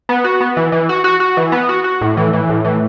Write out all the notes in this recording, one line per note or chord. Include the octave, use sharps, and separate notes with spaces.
B3
F#4
B3
E3
E3
F#4
F#4
F#4
E3
B3
F#4
F#4
A2
E3
E3
A2
E3